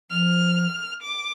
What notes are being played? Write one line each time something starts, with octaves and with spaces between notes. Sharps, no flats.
F3 F6
D6